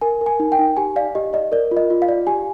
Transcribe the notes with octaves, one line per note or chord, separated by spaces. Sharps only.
A#4 G#5
A#4
G#5
D#4
G5
D#4
G4 G#5
D5 F5
G4 D#5
D5 D#5
A#4 D5
F4
D#5
F4
F5
D5
G4 G#5